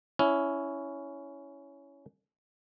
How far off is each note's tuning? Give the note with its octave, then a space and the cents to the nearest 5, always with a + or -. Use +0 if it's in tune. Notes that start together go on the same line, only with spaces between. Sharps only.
C#4 +10 E4 +0